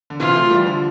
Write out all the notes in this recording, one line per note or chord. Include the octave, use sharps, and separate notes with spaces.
D3
C3 E3 F4
F3 A3
E3 G3
D3 F3